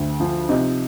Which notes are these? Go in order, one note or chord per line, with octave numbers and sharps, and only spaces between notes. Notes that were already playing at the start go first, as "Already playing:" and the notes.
Already playing: D2
F3
C3 D#4